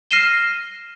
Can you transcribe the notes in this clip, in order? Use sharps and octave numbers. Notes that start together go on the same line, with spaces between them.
F6 A#6 C7 D#7 E7 G7